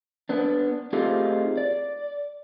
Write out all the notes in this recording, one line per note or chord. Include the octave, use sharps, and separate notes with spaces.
B3 D4
A3 C4 D#4 F4 G4 G#4
D5